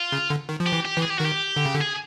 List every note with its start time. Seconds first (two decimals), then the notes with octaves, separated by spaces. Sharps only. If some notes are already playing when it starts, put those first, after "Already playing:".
Already playing: F4
0.12 C#3
0.30 D3
0.49 D#3
0.60 F3
0.66 G4
0.72 E3
0.85 G4
0.97 E3
1.02 G#4
1.10 G4
1.18 D#3 F#4
1.25 G4
1.56 D3
1.65 C#3
1.75 D3
1.81 G#4